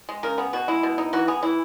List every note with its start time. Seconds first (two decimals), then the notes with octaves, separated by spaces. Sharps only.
0.09 G#3
0.23 C#3 A#4
0.38 B3 G#4
0.53 B2 F#4
0.68 G#3 E4
0.83 B2
0.98 D#4
1.13 E3 F#4
1.28 B3 G#4
1.43 E3 E4